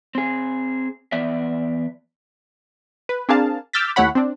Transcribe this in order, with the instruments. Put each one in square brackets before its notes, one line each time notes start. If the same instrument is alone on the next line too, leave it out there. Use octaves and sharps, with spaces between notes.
[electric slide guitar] C4 G#4
E3 B3 D5 E5
[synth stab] B4
C4 D4 G#4 A#4 F5 A5
D6 E6 F6 G6 A6 B6
D#2 A3 E4 C#5 F#5 B5
C4 D4